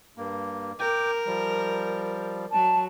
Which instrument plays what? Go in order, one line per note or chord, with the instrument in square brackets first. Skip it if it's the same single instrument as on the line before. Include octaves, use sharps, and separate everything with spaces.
[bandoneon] G2 A#3
[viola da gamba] A#4 [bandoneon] G5 D6
[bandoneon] F3 G3
[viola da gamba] F#3 [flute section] A5